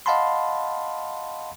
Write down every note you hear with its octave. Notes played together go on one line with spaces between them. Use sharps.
D#5 F5 F#5 A5 B5 C6